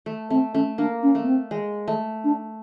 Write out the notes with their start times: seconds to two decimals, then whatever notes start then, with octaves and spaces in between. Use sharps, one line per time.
0.06 A3
0.30 A3 C4
0.54 A3 C#4
0.78 A#3 D4
1.03 C#4
1.15 A3
1.23 B3
1.27 C4
1.51 G#3
1.88 A3
2.24 D4